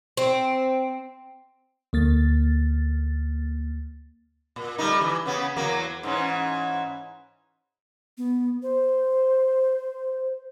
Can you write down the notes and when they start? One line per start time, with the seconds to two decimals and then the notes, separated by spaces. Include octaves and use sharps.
0.17 C4
1.93 D2 A#3 A6
4.56 A#2
4.78 G3 A3 D#4
5.01 E3
5.26 C#3 B3
5.56 E2 F#3 A#3
6.03 G#2 E3 C#4
8.18 B3
8.63 C5